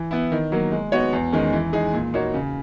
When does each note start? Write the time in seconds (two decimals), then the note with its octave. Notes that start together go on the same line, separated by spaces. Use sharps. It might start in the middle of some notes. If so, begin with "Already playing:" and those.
Already playing: E3
0.11 B3 E4
0.32 D#3
0.52 F#3 A#3
0.72 G#3
0.92 B3 D#4 F#4 C#5
1.13 E2
1.33 D#3 G#3 C#4 G#4
1.53 E3
1.73 G#3 D#4 G#4
1.94 A#2
2.14 A#3 D#4 F#4 C#5
2.34 C#3